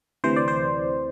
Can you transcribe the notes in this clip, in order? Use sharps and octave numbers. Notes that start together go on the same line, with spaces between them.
D2 C3 E3 C5
D5
C5